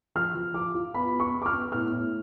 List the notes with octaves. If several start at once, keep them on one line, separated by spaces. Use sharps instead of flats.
F3 F6
F3
F4 D6
F4
B3 B5
F4
C#6
B3
D6
F6
B3
A2 F6
A2